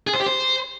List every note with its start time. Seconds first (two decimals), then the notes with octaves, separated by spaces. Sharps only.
0.07 G#4
0.14 C5
0.20 G4
0.26 C5